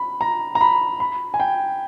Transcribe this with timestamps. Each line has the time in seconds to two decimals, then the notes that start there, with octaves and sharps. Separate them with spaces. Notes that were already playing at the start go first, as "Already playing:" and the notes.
Already playing: B5
0.21 A#5
0.55 A#5
0.61 B5
1.00 B5
1.34 G#5
1.40 G5